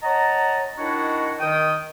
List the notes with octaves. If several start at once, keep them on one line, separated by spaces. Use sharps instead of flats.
C#5 D#5 F#5 A5 A#5
D#3 D4 E4 F#4 C#5 D#5
D#3 G5 D#6